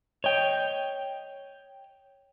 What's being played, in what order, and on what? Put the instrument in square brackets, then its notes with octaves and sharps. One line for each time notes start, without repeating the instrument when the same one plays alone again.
[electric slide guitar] C#5 D#5 G5